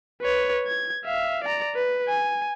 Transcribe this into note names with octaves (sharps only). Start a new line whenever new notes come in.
B4 C#5
G#6
E5 F5
D5 A#5
B4
G#5